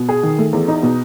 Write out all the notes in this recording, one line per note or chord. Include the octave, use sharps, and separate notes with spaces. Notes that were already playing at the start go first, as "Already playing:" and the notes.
Already playing: B2
G#4
D#3
A3
E2
D#4
B2